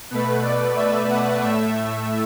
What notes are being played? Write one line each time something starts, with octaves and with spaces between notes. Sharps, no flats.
B2 A3 B4
D5
E5
F#5
A2 A3 E5